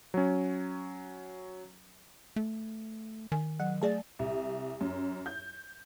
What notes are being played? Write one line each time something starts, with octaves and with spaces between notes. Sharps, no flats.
F#3 C#4
A3
D#3 G#5
F#3 F#5
A3 G#4 D5 A5
C2
F#2
G6